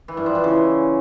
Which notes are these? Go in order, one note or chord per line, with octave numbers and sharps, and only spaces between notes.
E3
G2
F3
E3
C#3